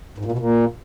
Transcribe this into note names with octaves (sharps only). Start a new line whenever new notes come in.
G#2
A#2
B2
A#2